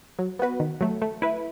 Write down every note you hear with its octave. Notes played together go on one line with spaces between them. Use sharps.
F#3
B3 F#4 B4
D#3
F#3 A3
A3
E4 B4